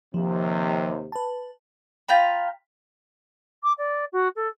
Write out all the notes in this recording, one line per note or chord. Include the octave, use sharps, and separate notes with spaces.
D#2 C3 F3
B4 A5
F4 G5 A#5 B5
D6
D5
F#4
A4